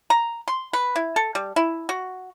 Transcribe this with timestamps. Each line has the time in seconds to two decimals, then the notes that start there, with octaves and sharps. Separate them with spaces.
0.10 A#5
0.48 C6
0.73 B4
0.96 E4
1.16 A4
1.35 G3
1.56 E4
1.89 F#4